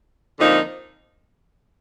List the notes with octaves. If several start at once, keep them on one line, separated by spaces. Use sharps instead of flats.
F2 D3 F3 A#3 D#4